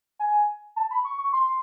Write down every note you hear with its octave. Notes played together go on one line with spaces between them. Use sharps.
G#5
A5
B5
C#6
C#6
C6